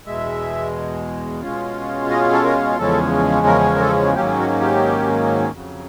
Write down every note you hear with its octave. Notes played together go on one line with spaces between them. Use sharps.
E2 B2 G#3 E5
B2 G#3 C#4 F4
D#5
A4
A#4
E2 C#3 F3 G#3 C#4 A4
A#4
A#4
A4
G#2 D#3 F#3 A#3 C#4 G4
F#4
G4
F2 C#3 F#3